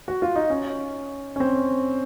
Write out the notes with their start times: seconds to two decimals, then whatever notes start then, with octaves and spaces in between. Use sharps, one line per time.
0.08 F#4
0.22 F4
0.36 D#4
0.50 C#4
1.36 C#4
1.40 C4